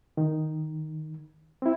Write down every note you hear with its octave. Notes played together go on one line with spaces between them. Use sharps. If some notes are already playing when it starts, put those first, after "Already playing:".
D#3
C4 E4